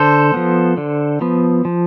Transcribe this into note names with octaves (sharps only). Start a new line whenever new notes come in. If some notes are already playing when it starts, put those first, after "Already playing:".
Already playing: D3 A4 C5
F3 B3
D3
F3 B3
F3